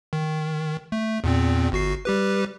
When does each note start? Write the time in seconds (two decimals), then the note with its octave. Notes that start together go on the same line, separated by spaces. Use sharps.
0.13 D#3
0.92 A3
1.24 E2 A#2 C4
1.72 G1 F#4 C7
2.05 G3 G4 B4